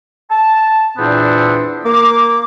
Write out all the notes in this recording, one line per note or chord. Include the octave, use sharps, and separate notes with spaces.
A5
E2 A#2 B3 C4 D4
A#3 D6